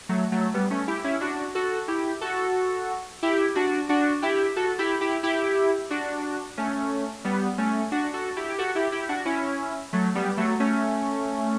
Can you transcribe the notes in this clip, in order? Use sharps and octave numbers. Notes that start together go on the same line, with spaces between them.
F#3 A3
F#3 A3
G3 B3
A3 C#4
E4 G4
C#4 E4
D4 F#4
F#4 A4
E4 G4
F#4 A4
E4 G4
D4 F#4
D4 F#4
E4 G4
F#4 A4
E4 G4
E4 G4
E4 G4
D4 F#4
A3 C#4
G3 B3
A3 C#4
D4 F#4
F#4 A4
E4 G4
G4
F#4 A4
E4 G4
E4 G4
D4 F#4
C#4 E4
F#3 A3
G3 B3
F#3 A3
A3 C#4